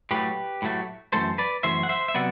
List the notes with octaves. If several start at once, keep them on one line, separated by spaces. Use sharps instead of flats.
A2 F#3 A3 G4 B4
A2 F#3 A3
F#2 E3 A3 A4 C5
B4 D5
F#2 E3 A3 C5 E5
F#5
C5 E5
E5
C3 F#3 B3 D5 F#5